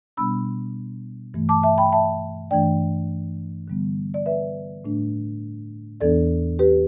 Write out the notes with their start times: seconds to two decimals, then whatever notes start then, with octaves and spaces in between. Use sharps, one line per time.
0.17 B2 G3 B3 D4 B5 E6
1.34 G2 E3 A3
1.49 A5 D6
1.63 E5 A5
1.78 G5 B5
1.93 E5 A5
2.51 G2 E3 A3 D4 D5 G5
3.68 D3 G3 B3
4.14 D5
4.26 B4 E5
4.85 A2 A3 D4
6.01 E2 E3 B3 D4 A4 D5
6.59 G4 B4